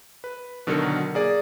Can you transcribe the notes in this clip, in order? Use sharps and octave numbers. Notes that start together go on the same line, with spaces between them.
B4
B2 D3 D#3 F#3 A#4 C#7
A#3 G#4 D5